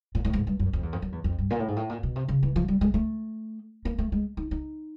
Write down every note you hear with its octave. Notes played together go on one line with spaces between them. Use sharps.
A#2
A2
G#2
G2
F#2
F2
E2
F2
F#2
E2
F2
G2
A#2
A2
G#2
A2
A#2
B2
C3
C#3
E3
F3
G3
G#3
A3
A#3
A3
G#3
D#4
D#4